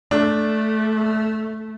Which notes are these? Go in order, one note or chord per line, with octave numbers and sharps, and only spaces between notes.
A3 D4